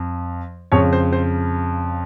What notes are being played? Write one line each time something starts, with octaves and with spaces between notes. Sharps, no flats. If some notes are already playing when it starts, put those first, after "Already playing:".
Already playing: F2
F2 C#3 C#5
C5
C5